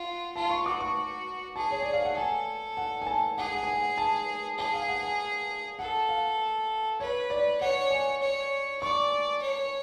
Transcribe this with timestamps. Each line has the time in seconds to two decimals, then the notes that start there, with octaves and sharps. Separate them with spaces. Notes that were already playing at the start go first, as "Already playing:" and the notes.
Already playing: F4 F#5
0.35 F4 A5
0.50 C#6
0.66 F#4 D6
0.80 C#6
1.56 G#4 A5
1.71 C#5
1.82 D5
1.93 F5
2.05 F#5
2.17 A4 G#5
2.77 F#5
3.02 G#5
3.07 A5
3.38 G#4 F#5
3.47 G#5
3.55 F#5
3.63 G#5
3.73 F#5
3.98 A5
4.58 G#4 A5
4.73 F5
4.88 F#5
5.03 G#5
5.79 A4 F#5
6.09 F5
7.00 B4 C#5
7.30 D5
7.60 C#5 F#5
7.91 G#5
8.22 C#5
8.82 D5 C#6
9.42 C#5